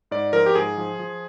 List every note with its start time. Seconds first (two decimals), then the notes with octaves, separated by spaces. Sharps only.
0.11 G#2 D5
0.33 F3 A#4
0.46 G4
0.55 G#2 G#4
0.77 F3
0.99 F3